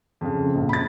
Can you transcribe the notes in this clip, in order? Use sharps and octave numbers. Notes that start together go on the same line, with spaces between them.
F2 C#3
A#1
B5 A6